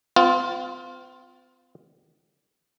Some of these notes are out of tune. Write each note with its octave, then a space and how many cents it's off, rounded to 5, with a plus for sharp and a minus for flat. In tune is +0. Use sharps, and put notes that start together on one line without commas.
C4 -40 F4 +5